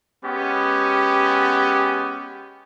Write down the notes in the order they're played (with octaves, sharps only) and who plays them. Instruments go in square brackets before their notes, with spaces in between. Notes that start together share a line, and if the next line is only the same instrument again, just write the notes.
[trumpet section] G#3 B3 C#4 G4